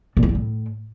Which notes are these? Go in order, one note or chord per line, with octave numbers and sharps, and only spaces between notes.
A#2
E3
G2
A2